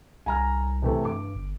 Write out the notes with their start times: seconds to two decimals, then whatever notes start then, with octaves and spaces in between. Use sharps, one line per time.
0.26 C2 G#5 A#5 F6
0.82 C3 E3 A3
1.05 G2 D6
1.36 G1